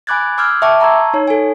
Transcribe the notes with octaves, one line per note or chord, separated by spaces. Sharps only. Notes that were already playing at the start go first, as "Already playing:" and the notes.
G#5 B5 D6 F#6 G#6 A6
C6 D6 E6 F6 G6 G#6
E5 G5 A5 C#6 D6
A5 A#5 C6 C#6 E6 G#6
D#4 C#5
A4 G#5